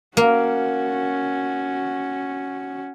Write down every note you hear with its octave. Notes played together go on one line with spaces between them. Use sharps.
A#3 C#4 F#4